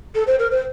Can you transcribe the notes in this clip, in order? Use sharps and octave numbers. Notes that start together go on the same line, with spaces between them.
A4
C5
A#4
C5